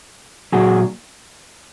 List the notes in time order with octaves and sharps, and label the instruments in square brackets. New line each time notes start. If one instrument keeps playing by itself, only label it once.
[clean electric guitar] A#2 F#3 F#4 G#4